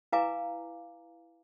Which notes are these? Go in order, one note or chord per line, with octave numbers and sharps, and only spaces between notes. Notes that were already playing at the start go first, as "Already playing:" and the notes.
E4 B4 F5 G#5 A#5 D6